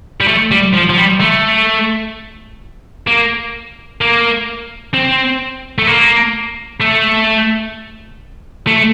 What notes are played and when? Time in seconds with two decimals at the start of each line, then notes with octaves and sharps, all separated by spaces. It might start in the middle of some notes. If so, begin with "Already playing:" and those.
0.21 G3
0.28 A3
0.51 G3
0.74 F3
0.89 F3
0.97 G3
1.21 A3
3.07 A#3
4.01 A#3
4.93 C4
5.78 A3
5.87 A#3
6.80 A3
8.67 A3